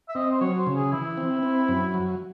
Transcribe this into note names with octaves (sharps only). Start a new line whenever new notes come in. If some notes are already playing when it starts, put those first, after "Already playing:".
E5
C4 D#5
C5
F#3 C#5
C5
C#3
G#4
E3 E4
C4
C4
F#2
F#3